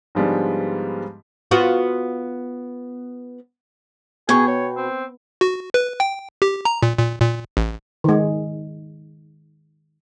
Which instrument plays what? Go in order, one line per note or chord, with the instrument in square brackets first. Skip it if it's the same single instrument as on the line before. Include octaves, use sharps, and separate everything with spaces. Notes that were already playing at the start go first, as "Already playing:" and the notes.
[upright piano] G#2 D3 F3 G3 G#3 B3
[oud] B3 F4 F#4
[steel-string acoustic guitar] B2 [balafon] B3 [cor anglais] G#4 [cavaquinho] G5 C#6
[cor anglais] C#5
C4
[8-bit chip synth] F#4
B4
G5
G4
A#5
A#2
A#2
A#2
A1
[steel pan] D#3 G#3